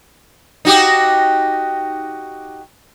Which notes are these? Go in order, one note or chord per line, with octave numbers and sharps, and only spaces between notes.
D#4 F#4 G4